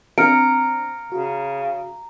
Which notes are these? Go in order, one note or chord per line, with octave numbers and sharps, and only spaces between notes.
C4 D4 A#5 F6 C#7 D7
C#3 F#4